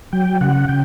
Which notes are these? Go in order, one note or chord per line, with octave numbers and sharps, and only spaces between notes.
F#3 G5
C#3 F#5
C#3 G5